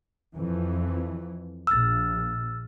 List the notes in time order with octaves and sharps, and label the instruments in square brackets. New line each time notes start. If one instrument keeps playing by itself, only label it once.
[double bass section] F2 E3
[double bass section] A#1 [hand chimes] E6 F6 A6